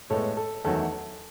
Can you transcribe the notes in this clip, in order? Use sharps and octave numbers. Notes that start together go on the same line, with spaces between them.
A2 G#3 B3 A4 C#5
A4
E2 D#3 F#3 A3 A4